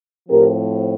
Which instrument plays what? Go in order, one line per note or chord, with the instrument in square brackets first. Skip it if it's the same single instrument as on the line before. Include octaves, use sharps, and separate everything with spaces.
[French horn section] A2 F3 C4 G4 A#4